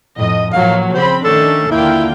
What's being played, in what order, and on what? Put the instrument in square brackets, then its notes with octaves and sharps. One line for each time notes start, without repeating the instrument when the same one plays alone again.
[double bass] F2 A2 [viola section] D#5
[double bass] A2 F3 [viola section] F#3 A#3 [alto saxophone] F5
[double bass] C#3 [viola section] C4 B5 [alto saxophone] C5
[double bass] D#3 [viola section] A3 C#4 D4 [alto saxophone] A4
[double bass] D#2 D3 [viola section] A#3 F4 G5 [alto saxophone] E4